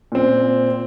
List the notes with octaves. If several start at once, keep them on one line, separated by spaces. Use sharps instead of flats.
A#2 C4